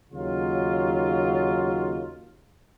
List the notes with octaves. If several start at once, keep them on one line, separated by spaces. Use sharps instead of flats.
D#2 C#3 F#3 D#4 F4